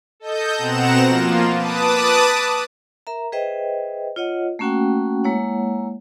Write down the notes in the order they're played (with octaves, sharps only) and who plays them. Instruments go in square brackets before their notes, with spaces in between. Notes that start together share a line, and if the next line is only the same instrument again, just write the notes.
[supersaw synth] A4 D#5 G6
B2 C4 F#5 A#5 E7
F3 A#3 F4
B4 A5 D6 D#6
[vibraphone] A#4 E5 A#5
G#4 B4 C5 D#5 E5 G5
F4 C#5 D#5 F#5
A3 A#3 C#4 F#4 F#5 G5
G#3 A#3 E4 C#5 F#5